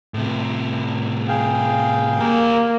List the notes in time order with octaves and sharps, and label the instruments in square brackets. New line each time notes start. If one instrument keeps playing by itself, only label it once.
[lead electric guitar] A2 C3
[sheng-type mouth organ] G#4 F5 G5
[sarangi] A#3 [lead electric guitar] G4 A#4